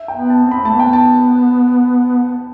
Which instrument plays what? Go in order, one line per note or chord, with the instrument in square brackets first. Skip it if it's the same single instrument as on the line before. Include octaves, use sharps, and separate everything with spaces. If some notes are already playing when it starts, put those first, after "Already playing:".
Already playing: [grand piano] E5
G5
[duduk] B3
[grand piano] A5
[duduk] C4
[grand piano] B5
[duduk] A3 [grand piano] A5
[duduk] B3
[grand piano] G5
A5